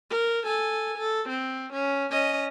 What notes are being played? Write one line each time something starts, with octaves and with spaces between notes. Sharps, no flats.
A#4
A4 G#5
A4
C4
C#4
C#4 D#5